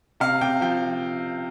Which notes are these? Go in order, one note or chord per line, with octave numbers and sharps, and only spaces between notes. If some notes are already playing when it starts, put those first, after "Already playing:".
C3 F5
C3 G5
F3 G5